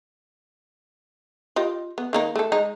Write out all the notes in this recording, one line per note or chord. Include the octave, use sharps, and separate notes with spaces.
F4 G4 D#5
B3
D#3 A#3 D#4
A3 A4
G#3 D#4